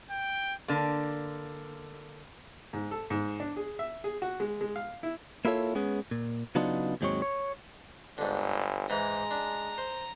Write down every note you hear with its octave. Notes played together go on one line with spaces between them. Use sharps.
G5
D3 A#3
G#2
A4
G#2
D4
G#4
E5
G#4
F#4
G#3
G#3
F5
E4
A#3 E4 F4 A4 C#5
G#3 B3 C#4 G#4
A#2
C#3 F#3 B3 D4 D#4 F4
D#2 G#2 F#3 G#3 C4 C#5
C#5
G1 G#2 D3
G#2 E3 G#3 A#5
D4
C5